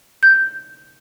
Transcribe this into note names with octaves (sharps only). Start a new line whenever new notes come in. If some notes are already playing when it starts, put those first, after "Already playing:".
G6